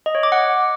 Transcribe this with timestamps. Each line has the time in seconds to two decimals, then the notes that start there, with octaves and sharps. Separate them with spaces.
0.06 D#5
0.15 C#5
0.23 D6
0.32 F#5